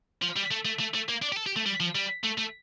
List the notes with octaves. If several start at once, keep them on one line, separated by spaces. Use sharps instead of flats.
F3
G3
A3
A3
A3
A3
A#3
D4
G4
A4
G4
A3
G3
F3
G3
A3
A3